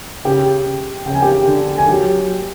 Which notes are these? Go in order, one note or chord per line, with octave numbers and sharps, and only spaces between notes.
C#3 G4 G5
C#3 G5
G#5
G4 G5
D3
G#5
F#3 G4 G5